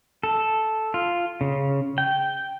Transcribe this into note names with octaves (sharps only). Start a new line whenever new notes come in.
A4
F4
C#3
G5